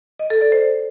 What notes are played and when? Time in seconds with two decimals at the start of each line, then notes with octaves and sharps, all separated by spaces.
0.20 D#5
0.30 A4
0.41 D5
0.52 C5